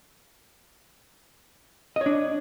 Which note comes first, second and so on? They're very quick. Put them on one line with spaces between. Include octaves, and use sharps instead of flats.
D#5 C#5 D4